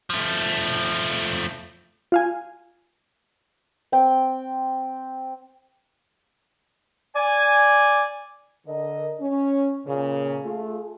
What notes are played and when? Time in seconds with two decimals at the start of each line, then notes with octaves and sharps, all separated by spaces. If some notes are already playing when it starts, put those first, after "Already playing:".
0.10 F3 A3
2.12 F4 F5 G#5
3.92 C4 G5
7.15 D5 G#5
8.67 D3 A#4 D#5
9.20 C#4
9.86 A#2 C#3
10.43 A3 F4 G#4